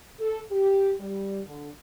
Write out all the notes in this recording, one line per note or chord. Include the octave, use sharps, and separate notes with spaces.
A4
G4
G3
D3